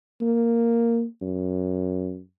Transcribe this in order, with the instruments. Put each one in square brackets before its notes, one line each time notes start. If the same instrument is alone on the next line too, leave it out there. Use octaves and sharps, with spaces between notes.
[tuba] A#3
F#2